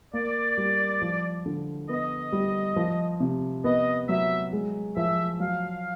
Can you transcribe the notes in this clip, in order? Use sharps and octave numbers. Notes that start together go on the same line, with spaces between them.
A#3 D5
G3
F3
D3
B3 D#5
G3
F3
C3
B3 D#5
F#3 E5
G#3
F3 E5
F#3 F5